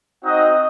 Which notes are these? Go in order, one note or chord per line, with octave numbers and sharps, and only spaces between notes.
C4 D#4 F#4 D#5